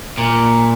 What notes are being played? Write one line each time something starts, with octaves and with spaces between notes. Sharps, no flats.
A#2